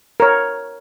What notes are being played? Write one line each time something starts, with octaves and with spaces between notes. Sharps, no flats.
A#4 C#5